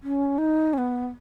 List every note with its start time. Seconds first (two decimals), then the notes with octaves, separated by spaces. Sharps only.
0.03 C#4
0.38 D#4
0.73 C#4
0.78 B3